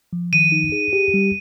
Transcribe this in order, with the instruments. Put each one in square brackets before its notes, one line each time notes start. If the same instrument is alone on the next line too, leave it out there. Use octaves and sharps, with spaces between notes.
[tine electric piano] F3
[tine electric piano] D#3 [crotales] D#7
[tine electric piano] D#4
G#4
G4
G3